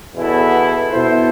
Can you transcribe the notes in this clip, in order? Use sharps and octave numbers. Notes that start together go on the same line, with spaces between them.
E2 B2 B3 E4 A4
B2 B3 E4 A4 C5